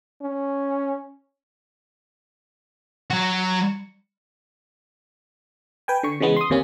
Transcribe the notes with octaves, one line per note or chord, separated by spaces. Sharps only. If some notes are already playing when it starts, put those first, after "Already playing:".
C#4
F#3 F#4
B4 G5 G#5
D3 C#6
C#3 E3 G#3 B3
C6 D#6
D#2 C3 A#3 C#4